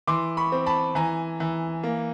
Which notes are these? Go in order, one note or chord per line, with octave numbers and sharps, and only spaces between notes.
E3 C6 D6
B5 C#6
C4
A5 B5
E3 G#5 A#5
E3
A#3